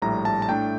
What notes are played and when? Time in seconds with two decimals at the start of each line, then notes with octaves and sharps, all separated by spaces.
0.02 A#1 A2 G3 A#5
0.25 A5
0.42 A5
0.49 A2 A3 D4 G5